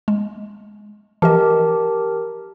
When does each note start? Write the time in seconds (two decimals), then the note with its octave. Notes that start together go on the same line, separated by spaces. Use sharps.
0.08 G#3
1.22 E3 F3 G4 A#4 D#5 A5